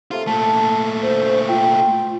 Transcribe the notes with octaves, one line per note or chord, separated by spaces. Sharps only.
C3 A3 A#3 F4
A#2 A3 A5
D2 C5
F4 G5